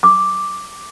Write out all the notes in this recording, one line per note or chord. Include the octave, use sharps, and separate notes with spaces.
D6